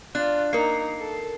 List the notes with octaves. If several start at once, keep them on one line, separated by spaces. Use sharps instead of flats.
D4 F4 F#6
A#3 D#4 A#4 A#5 C7
A4